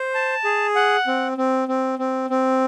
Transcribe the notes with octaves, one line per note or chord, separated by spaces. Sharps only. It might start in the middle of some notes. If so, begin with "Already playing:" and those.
Already playing: C5
A5
G#4
F#5
C4
C4
C4
C4
C4